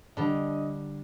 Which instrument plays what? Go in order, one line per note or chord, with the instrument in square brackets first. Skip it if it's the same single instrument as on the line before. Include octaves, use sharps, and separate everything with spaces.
[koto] D3 G3 [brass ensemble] D4 D#5